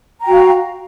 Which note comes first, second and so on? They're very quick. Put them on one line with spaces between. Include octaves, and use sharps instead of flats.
A#5 G5 F#4 F5